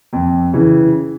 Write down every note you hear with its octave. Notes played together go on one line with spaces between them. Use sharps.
F2
C#3 E3